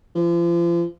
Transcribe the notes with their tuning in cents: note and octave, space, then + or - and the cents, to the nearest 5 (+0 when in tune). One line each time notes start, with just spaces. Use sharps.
F3 -35